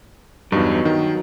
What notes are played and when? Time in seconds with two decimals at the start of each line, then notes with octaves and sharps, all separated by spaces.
0.52 E2 G2 F#3 D#4
0.85 D#3